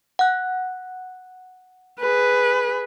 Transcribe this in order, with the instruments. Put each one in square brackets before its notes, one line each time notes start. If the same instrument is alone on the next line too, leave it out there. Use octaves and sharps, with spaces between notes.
[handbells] F#5 F#6
[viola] G#4 B4